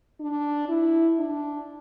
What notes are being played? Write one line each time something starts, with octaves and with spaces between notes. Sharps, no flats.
D4
E4
D4